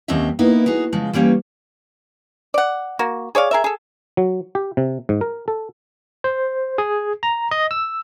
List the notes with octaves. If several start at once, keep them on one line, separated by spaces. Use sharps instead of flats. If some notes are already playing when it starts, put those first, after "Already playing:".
D#2 F#3 C4 C#4 D#5 E5
A#3 B3 D#4 E4
D#4 F#4 G#4
C#3 F3 G#3
E3 G3 A#3 C#4
D5 F#5
A#3 F#4
G#4 C#5 D5 F5
G#4 A#4 E5
G#4 A4
F#3
G4
C3
G#2
A#4
A4
C5
G#4
A#5
D#5
E6